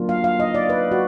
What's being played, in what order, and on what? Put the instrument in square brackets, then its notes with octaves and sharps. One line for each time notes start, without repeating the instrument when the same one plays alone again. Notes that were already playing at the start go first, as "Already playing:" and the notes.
Already playing: [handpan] F#3 A#3 D4 F4
F5
F5
D#5
D5
B4
F#4